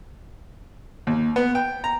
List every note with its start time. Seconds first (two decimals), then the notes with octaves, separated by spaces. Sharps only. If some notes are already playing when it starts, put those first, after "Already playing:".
1.07 D#2
1.36 B3
1.55 G5
1.84 A#5